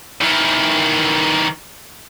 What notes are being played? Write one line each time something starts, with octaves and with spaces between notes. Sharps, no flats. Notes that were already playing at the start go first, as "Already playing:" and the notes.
D#3 E3